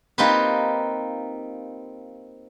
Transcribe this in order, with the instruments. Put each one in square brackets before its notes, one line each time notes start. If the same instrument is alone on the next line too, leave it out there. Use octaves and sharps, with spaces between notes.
[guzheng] A#3 C4 D#4 F4 G4 B4